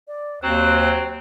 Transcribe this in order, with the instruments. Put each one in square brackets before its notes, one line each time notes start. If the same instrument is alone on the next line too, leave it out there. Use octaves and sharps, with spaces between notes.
[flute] D5
[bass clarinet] D#2 [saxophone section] F#3 C4 [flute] F#6